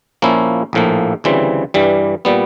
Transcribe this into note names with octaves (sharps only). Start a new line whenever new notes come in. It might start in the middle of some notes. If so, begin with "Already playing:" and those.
A#2 F3 A#3 C#4 E4
A#1 A2 F3 A#3
D2 C#3 E3 G3 C4
G2 E3 G3
A#2 G3 B3